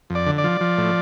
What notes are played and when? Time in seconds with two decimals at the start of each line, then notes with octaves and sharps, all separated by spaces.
0.10 F2
0.15 D5
0.27 D3
0.38 D5
0.44 F3
0.61 F3
0.78 A2